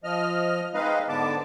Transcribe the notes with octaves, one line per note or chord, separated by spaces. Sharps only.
F3 D#5 F6
G#3 C4 D#4 B4 D#5 F5
G#2 D3 B3 A5 D6